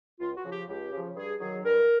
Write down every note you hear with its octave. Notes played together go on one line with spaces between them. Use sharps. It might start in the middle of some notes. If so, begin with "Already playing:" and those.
C#2 F4
F#4
C#3 F3
G4
C#2 G4
C#3 F3
G2 G#4
D#3 F#3 G#4
G2 A#4